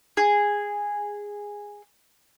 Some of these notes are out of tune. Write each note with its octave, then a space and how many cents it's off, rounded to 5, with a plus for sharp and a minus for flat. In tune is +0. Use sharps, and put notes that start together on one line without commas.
G#4 -10